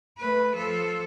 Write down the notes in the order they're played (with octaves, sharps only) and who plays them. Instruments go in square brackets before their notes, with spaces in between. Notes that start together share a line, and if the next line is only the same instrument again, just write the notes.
[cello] A3 B4
F3 A4